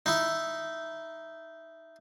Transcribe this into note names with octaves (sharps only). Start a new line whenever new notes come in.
D#4 E4